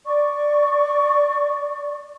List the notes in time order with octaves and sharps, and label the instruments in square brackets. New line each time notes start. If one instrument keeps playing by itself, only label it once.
[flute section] D5 C#6